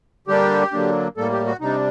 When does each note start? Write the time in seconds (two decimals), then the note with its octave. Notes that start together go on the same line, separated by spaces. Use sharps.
0.27 D3 G3 A#3 D4 G4
0.72 D3 F#3 A#3 D4
1.17 A2 G3 A#3 A4
1.32 G4
1.46 F#4
1.61 C3 G3 D4 D#4